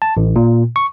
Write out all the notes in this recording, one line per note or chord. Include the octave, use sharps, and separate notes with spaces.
A5
A1
A#2
C#6